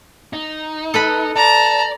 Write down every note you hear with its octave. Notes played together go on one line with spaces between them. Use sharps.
D#4
A4 B4 B5
D5 A5 A#5